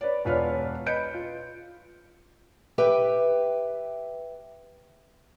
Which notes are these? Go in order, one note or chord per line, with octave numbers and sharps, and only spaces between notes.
B4 C#5 D5
E1 F4 B4 C#5 D5 F6
B4 D#5 G6 C#7 D7
F4
G4 B4 E5 G5